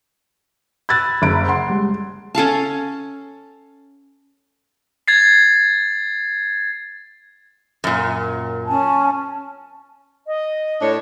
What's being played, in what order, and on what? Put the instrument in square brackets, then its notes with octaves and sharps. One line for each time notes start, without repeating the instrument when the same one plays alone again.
[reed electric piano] B5 E6 F#6 [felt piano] G#6 A6
[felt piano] F#1 D7
[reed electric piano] F#5 [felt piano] C6
[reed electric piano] G3 G#3
[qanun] C#4 A4 F5 A5
[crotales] G#6 A6 C7
[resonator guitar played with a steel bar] F#2 A#2
[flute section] C#4 G#5 A5
[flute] D#5
[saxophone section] A2 D4 C#5